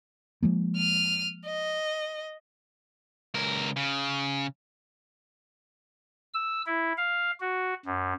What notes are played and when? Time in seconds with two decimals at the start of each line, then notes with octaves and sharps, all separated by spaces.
0.43 F3 G#3 A#3
0.77 F6 D#7
1.46 D#5
3.34 C#2 A#4
3.76 C#3
6.34 E6
6.66 E4
6.98 F5
7.40 F#4
7.85 F#2